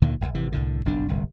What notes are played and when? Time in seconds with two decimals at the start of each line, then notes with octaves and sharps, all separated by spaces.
0.02 D2 A#2 D3 D#3
0.21 D1 C2
0.34 G#1 C3 E3
0.52 C2 A2 D3
0.85 F#1 B1 G2 D4
1.08 D1 G1 C2